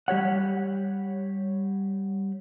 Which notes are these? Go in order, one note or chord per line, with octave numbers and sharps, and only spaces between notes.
G3 G4 C#5 F#5